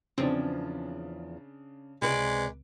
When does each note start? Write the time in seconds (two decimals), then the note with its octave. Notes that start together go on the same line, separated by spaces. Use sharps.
0.18 E2 C#3 F3 C4 D4
2.02 C#2 C3 G#3 B4 D5